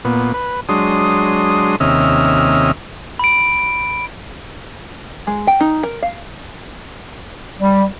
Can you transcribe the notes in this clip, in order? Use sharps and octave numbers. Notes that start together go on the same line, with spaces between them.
A#2 B3
B4
F#3 G#3 D4 C6 D#6
D#2 C3 C#4 D#5 E5 F6
B5 D7
G#3
G5
D#4
A#4
F5
G3